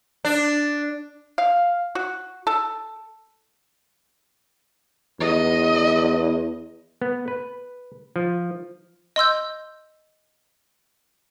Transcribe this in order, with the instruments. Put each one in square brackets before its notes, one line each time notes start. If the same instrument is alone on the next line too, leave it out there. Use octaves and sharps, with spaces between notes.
[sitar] D4
[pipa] F5
F#4
A4
[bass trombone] E2 [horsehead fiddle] D#5
[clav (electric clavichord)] B3
B4
F3
[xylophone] D#5 C6 E6 G6